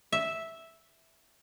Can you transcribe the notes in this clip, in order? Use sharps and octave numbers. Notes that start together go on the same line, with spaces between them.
E5